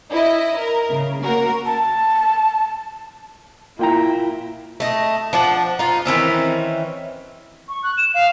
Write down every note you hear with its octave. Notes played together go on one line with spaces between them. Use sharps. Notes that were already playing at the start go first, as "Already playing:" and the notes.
E4 D#5
A#4
C#3
A#3 F#4 A#4
A5
A#2 E4 G5 A#5
A3 D#5
F3 D4 F#5
D#4 F4
D#3 E3 C4 C#4
C#6
F#6
E7
F5